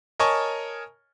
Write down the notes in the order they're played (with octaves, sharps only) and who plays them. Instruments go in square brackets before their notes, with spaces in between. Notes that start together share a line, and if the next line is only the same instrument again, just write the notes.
[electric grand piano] A#4 C#5 D#5 G#5 A5 C#6